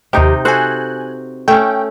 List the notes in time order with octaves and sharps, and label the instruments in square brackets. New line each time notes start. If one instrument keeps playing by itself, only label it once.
[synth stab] D#2 G4 [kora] C3 D#4 G5
[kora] F#4 A4 C5 [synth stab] G#5 F#6
[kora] A3 C#4 [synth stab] G5